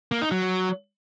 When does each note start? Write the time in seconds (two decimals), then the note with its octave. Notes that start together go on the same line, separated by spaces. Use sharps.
0.12 A#3
0.21 D#4
0.31 F#3